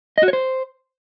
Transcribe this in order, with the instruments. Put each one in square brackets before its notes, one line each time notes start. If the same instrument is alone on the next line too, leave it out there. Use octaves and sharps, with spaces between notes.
[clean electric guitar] D#5
F#4
C#5
C5